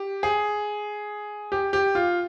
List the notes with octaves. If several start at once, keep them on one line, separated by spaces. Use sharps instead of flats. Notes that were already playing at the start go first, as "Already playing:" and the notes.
Already playing: G4
G#4
G4
G4
F4